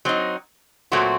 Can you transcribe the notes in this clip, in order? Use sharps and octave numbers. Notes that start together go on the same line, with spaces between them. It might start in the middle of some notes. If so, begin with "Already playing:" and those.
F#3 C4 D#4
A#2 F#3 A3 C4 F#4